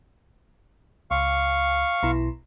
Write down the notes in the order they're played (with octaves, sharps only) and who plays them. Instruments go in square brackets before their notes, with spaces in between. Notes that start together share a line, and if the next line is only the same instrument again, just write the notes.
[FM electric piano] C#2 [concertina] F5 C#6
[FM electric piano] B1 B2 E4